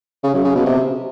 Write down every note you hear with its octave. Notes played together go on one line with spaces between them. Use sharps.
C#3
F#2
C#3
B2
C3